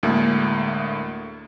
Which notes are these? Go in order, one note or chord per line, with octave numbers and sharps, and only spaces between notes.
D2 A2 G#3 A#3